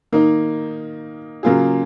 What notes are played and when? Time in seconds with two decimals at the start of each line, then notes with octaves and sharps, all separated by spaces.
0.12 D#3 A#3 D#4
1.43 C#3 F#3 A#3 F4 G#4